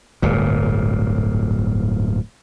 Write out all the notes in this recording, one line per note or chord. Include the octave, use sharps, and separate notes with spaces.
D1 G1 A#2